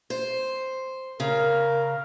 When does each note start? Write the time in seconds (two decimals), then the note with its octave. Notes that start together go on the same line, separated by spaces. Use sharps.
0.10 C5
1.20 C#3 A#4